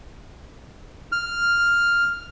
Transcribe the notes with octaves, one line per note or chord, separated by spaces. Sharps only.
F6